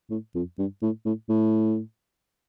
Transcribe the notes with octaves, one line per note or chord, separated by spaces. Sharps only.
A2
F2
G2
A2
A2
A2